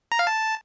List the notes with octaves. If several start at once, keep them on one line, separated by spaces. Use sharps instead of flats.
A#5
F5
A5